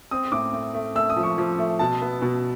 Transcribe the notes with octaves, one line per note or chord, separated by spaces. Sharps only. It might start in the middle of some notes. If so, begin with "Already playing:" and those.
C4 D#6
A2 D6
A3
A3
A3 E6
D#6
F3
C#6
F3
A3
B2 A5
B3
B2